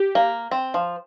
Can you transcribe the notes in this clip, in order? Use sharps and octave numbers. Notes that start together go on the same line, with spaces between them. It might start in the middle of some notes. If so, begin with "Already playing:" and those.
Already playing: G4
A#3
C4
F3